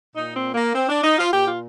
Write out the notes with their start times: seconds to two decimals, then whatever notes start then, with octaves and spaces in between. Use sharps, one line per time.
0.15 A#2 D#4
0.35 C4
0.54 A#3
0.75 C4
0.89 D4
1.04 D#4
1.18 F4
1.32 A#2 G4
1.47 F4